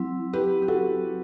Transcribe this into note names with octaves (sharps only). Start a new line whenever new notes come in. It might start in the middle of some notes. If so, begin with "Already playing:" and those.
Already playing: F#3 C4 E4
G4 B4
G4
F#4 A4